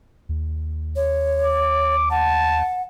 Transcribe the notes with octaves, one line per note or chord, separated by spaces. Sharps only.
D#2
C#5
D6
F#5 A5